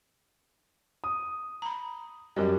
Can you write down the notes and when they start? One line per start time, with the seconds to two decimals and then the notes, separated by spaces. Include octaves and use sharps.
1.04 D#6
1.62 A#5 B5
2.36 F#2 G3 A#4 D#5